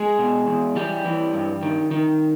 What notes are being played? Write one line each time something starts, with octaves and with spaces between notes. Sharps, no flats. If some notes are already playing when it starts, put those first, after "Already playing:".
Already playing: G#3 G#4
B2
E2
E3 G3 G4
E3
G2
D#3
D#3